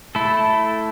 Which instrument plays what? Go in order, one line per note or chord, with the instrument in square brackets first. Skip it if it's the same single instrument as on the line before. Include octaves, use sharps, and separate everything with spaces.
[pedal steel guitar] A3 E4 A4